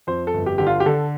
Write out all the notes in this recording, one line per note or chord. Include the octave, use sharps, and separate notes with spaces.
F2 C5
A4
G1
G4
D3 G4
F4
G4
D3 A4